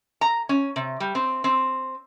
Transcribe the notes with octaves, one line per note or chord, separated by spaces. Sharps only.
A#5
C#4
C3
G3
C4
C4